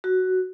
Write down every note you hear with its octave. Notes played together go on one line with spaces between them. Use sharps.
F#4